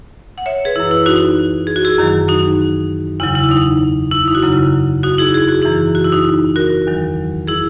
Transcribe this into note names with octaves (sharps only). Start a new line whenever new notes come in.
F#5
C#5 E5
G#4 B4
F#2 E3 E4
E4
D#4 F#4
G#4
F#4
E4 G#4
F#2 D#3 F#3
D#4 F#4
E2 C#3 F#3 E4
E4
D#4
E4
D#4
F#4
F#2 C#3 F#3 E4
D#4 F#4
E4 G#4
G#4
F#4
F#2 E3 E4 G#4
F#4
E4
D#4 F#4
F#4 A#4
E2 D#3 F#3
E4 G#4